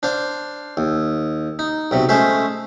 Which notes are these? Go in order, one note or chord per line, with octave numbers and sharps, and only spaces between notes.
D4 C5 F5
D#2
D#4
B1 C3 F#3
G#3 A3 C#4 C5 E5